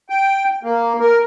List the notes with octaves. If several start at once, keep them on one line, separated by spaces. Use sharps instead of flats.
G5
A#3
A#4